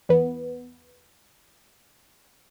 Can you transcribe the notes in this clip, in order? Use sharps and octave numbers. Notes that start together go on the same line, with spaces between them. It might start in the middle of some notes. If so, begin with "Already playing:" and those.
E2 B3